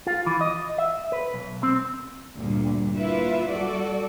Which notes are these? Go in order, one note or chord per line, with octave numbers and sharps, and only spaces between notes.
F4
E3
D#5
E5
B4
B1
C4
D2 G2 A#2 D3
A#3 E4 F4 B4 E5
G3 F#4 A4 D5